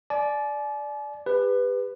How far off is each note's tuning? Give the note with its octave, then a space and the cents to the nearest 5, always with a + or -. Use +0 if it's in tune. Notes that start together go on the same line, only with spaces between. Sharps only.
D5 +0 G#5 +45
G4 +35 B4 +10